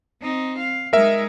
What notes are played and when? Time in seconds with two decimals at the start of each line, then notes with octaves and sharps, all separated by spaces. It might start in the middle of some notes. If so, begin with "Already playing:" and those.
0.22 C4 D#4
0.59 F5
0.93 G#3 D#4 A#4 E5